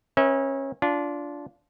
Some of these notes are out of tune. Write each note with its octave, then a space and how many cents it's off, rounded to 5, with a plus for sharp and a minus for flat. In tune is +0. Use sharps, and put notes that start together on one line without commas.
C#4 -25 B4 -40 E5 -35
D4 -20 F4 +0